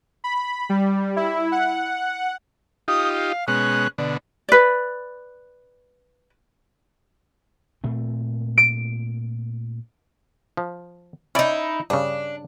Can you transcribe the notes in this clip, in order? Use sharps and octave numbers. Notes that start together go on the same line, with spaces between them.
B5
G3
E4
F#5
D#4 F4 G4 D#6
F5
B2 G#3 C#4 F#6
B2 D3 D5
B4 D5
A#2 A3 C4
D7
F3
C#4 D#4 E4 D5
G2 C#3 D4